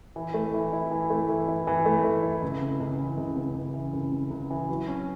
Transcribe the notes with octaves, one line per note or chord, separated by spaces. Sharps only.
E3
A3
E3
E4
E3
A3
E3
E4
E3
A3
E3
E4
C#2
C#3
C#2
E3
C#2
C#3
C#2
E3
C#2
C#3
C#2
E3
F#3
C#4